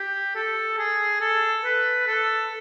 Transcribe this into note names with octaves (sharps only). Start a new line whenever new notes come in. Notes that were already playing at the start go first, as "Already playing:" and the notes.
Already playing: G4
A4
G#4
A4
B4
A4